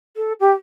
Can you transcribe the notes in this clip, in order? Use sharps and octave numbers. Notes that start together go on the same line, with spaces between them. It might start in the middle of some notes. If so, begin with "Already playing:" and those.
A4
G4